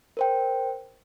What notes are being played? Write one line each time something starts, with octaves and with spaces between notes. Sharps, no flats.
A#4 C5 G5